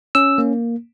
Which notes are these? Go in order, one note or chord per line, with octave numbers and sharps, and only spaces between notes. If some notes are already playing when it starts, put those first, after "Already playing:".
C#4 E6
A#3